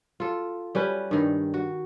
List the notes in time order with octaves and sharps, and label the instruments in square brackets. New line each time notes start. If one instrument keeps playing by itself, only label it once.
[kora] F4 A4
G3 C#4 B4
G2 D#3
F#4